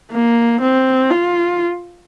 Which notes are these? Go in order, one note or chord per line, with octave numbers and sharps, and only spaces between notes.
A#3
C4
F4